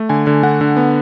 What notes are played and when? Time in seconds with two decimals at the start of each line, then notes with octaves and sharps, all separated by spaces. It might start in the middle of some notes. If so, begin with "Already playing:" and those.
Already playing: A3
0.09 D3 G#5
0.27 D3
0.43 D3 F#5
0.61 D3
0.77 B3